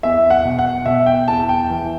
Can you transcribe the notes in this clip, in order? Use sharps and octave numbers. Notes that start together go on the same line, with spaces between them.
E2 E5
F#5
B2
F#5
B2 E5
G5
E2 A5
G5
E3